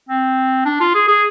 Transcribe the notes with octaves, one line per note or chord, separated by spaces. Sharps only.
C4
D4
F4
G#4
G#4